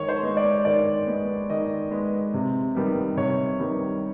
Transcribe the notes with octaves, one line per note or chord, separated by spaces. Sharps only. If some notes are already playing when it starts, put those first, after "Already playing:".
Already playing: D#3 G#3 C#5
C5
G#3 B3
D5
D#3 D5
G#3 B3
D#3 D#5
G#3 B3
C3
D#3 G3 B3
C3 C#5
D#3 G3 B3